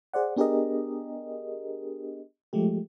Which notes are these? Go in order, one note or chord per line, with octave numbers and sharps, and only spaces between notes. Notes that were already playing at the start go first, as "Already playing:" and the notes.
G#4 C5 D5 F#5
B3 D4 G4 G#4 A#4 D#5
F3 G#3 A3 G4